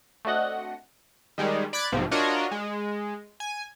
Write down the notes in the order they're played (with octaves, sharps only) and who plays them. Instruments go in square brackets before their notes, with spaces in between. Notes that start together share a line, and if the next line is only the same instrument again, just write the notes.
[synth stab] A3 C4 D4 F#4 D#5 F#5
[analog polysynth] D#3 G3 G#3
D5 B5 D6 F#6 G#6 A6
B1 G#2 C3 F3
D4 F4 F#4 A#4 C#5 D#5
G#3
G#5